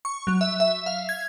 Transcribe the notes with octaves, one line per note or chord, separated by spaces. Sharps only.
C#6
F#3
E5
E5
F5
G#6